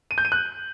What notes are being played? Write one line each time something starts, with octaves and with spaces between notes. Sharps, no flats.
D#7
G6
D#7
F#6